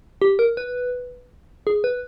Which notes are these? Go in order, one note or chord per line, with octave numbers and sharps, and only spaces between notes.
G4
A#4
B4
G#4
B4